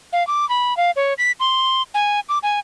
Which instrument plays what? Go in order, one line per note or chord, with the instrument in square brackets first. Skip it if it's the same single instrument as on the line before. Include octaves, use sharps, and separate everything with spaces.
[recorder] F5
D6
B5
F5
C#5
B6
C6
G#5
D6
G#5